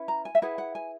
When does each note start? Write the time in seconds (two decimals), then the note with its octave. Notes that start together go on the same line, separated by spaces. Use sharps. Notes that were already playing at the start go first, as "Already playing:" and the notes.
Already playing: C#4 E4 B4
0.08 A#5
0.25 G#5
0.35 E5
0.42 E4 G#4 B4 F#5
0.58 F#5
0.75 G#5